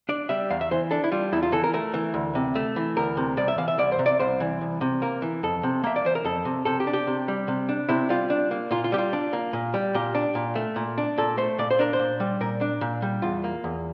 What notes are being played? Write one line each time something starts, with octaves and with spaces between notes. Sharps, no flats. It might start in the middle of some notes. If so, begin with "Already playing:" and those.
D4 D5
G3 E5
E2 F5
E5
E3 C5
D4 A4
E4
G3 F4
E2 E4
F4
E3 A4
A#4
A3 A#4
E3
D2
C3
A3
E3
D2 A#4
C3
C2 D5
E5
E3 F5
E5
C2 D5
C5
C3
D5
C2 C5
E3
C2
C3
A#3 A#4
E3
F2 A4
C3
A#3 E5
D5
E3 C5
A#4
F2 A4
C3
C3 A4
G4
D4
G4
C3
G3
C3
D4
C3 E4
G3 F4
D4
A#3
A#2 F4
F4
G3 G4
F4
D4
A#3
A#2
G3
A#2 G4
D4
A#2
A3
A#2
D4
A#2 A4
A3 C5
A#2 D5
C5
D4 A#4
C5
A#2
G3
A#2 A#4
D4
A#2
G3
E2 F4
A#3
E2